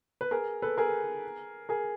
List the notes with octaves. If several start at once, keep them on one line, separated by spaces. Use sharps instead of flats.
B4
G#4 A#4
A4 B4
G#4 A#4
G#4 A#4